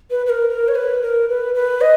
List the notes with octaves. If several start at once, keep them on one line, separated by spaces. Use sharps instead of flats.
B4
B4
A#4
A#4
C#5
B4
A#4
B4
B4
D#5